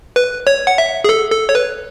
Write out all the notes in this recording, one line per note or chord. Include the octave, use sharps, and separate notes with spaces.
B4
C#5
F#5
E5
G#4
A4
A4
C#5
B4